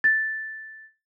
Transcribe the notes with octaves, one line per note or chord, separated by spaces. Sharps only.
A6